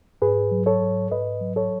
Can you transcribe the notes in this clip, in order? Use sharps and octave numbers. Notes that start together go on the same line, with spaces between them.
G#2 G#4 B4
F#3
A4 C#5
G#2
G#2 B4 D#5
F#3
A4 C#5